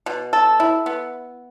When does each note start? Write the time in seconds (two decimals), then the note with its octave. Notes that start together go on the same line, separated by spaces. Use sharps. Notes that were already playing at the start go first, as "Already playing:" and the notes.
0.06 B2
0.33 A4
0.60 E4
0.86 B3